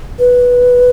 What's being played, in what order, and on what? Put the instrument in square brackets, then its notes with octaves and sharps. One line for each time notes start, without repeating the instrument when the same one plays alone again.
[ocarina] B4